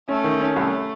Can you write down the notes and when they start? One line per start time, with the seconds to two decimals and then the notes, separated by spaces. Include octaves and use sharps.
0.08 A3 C#4
0.24 D#3
0.41 C#4
0.56 C2 A3